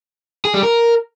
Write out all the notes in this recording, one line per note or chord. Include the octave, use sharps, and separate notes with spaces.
G#4
G3
A#4